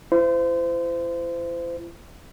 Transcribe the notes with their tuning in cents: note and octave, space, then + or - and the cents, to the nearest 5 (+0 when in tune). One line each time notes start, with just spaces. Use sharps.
E4 +40 C5 -30